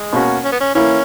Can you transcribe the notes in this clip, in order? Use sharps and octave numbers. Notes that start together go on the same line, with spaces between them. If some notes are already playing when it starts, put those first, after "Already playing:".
Already playing: G#3
B2 A#3 C#4 F#4
C#4
B3
C#4
E3 A#3 C#4 E4